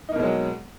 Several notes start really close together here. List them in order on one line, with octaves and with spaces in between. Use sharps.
D#4 A#3 B2 G#3 F#3